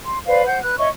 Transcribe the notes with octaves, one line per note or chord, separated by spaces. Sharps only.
C6
B4 C5 D5 F5
C5 F#5 G6
B4 F#6
C#5 D#5 E5 C#6